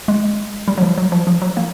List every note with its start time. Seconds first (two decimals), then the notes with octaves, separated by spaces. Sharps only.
0.08 G#3
0.68 G3
0.78 F#3
0.83 F3
0.98 F#3
1.12 F3
1.27 F3
1.42 F#3
1.57 A#3